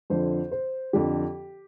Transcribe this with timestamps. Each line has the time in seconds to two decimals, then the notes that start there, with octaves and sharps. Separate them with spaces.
0.10 F2 D3 F3 C5
0.52 C5
0.93 F2 D3 F3 G4